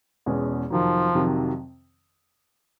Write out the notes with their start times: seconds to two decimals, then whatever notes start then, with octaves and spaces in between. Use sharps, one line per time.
0.26 E2 B2 G#3 C#4
0.70 F2 C3 D#3 F3 F#3
1.15 F2 C3 D#3 F#3